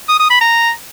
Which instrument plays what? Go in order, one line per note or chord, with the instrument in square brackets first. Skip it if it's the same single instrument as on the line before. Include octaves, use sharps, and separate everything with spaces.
[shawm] D#6
D#6
B5
A#5